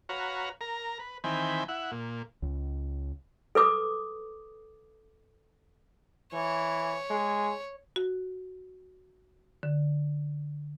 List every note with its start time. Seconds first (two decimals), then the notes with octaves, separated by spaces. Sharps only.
0.09 F#4 B4 C#5 F5 A#5
0.61 A#4 A#5
0.99 B4
1.24 D#3 E3 C4 G5 G#5 B5
1.68 E4 F#5
1.92 A#2
2.42 C#2
3.55 A4 B4 D6 D#6
6.33 E3 C#5
7.10 G#3
7.96 F#4
9.63 D3